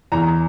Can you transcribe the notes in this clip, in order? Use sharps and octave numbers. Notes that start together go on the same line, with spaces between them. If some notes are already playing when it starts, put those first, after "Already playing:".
E2 A#5